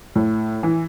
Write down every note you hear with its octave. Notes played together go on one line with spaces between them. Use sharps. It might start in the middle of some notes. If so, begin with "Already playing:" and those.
A2
E3